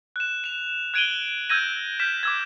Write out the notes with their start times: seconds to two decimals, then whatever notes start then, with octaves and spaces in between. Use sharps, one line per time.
0.16 F#6 E7
0.44 E7 F7
0.94 F#6 G#6 D7 D#7 F#7 G7
1.50 E6 G6 G#6 A#6 D#7
1.99 F6 G6 B6 E7
2.23 D6 E6 G#6